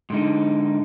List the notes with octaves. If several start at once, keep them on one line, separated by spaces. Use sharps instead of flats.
G#2 D3 D#4